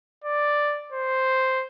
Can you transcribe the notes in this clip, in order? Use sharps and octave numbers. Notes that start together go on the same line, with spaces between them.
D5
C5